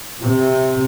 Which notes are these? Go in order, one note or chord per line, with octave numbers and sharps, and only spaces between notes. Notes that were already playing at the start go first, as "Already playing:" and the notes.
C3